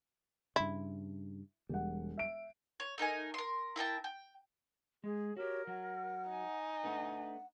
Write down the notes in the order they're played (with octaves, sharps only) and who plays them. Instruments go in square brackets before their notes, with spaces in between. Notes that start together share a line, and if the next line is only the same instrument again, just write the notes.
[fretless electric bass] G2 C#3 [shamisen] E4
[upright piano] E1 F#5 [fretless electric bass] G3
[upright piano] E5 D7
[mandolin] C#5
A3 D#4 A#4 G#5
A#4 C6
E4 A#4 G5 A5
G5
[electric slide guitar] G#3 [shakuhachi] G#4
[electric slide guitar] F#4 G4 [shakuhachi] A#4 [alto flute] C#5
[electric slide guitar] F#3 [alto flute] F#5
[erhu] D#4 [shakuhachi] G#5
[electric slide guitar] A3 D4 B4 [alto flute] F#5